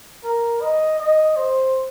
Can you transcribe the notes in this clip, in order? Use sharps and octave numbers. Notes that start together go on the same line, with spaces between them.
A#4
D#5
D#5
C5